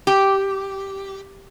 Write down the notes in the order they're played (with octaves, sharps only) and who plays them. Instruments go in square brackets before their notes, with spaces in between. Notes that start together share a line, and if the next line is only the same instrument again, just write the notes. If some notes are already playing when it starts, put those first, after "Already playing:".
[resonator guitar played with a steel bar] G4